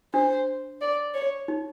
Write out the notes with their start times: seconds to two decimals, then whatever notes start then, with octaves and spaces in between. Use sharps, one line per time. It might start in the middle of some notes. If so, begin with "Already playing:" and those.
0.14 D4 C5
0.81 D5
1.14 C#5
1.48 D#4